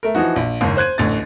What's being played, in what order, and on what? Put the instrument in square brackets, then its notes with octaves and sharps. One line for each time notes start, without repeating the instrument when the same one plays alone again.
[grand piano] A3 A#4
E3 F3 D#4 F#4
A#1
F#1 D#2 G#2
C5 F#6 G#6 D#7
D1 A1 D2 A6